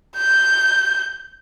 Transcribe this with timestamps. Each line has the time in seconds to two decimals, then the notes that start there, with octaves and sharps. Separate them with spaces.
0.17 G6